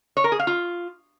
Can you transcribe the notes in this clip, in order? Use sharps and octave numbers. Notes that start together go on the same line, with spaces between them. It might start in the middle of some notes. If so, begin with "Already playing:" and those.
C#5
A#4
G#4
F5
F4